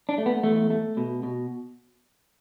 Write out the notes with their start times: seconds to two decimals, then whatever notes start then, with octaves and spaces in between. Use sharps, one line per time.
0.09 D4
0.18 A3
0.26 B3
0.43 E2 A3
0.70 A3
0.97 B2
1.23 B2